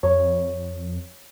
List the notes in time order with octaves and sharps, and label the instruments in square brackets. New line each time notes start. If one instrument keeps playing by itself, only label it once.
[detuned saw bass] F2 [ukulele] C#5